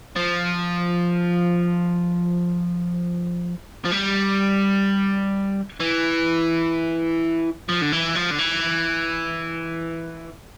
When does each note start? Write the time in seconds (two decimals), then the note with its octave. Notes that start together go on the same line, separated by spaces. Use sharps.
0.16 F3
3.85 F3
3.92 G3
5.80 E3
7.69 F3
7.82 D3
7.92 E3
8.15 F3
8.30 D3
8.39 E3